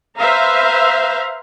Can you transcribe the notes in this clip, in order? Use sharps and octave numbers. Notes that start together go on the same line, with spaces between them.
B4 C5 E5 F5 A#5